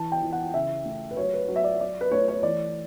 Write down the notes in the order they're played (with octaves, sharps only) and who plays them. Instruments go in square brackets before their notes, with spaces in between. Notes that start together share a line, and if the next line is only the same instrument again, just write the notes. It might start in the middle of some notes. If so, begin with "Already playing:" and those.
Already playing: [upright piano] E3 A5
G5
E3
F#5
C#3 E5
A3
B4
F#3 C#5
B4
F#3
E5
D5
F#3 D5
B4
A3 C#5
C#5
E3 D5